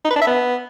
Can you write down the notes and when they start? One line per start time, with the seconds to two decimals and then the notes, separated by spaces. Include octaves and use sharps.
0.05 D#4
0.10 B4
0.16 D4
0.21 E5
0.27 B3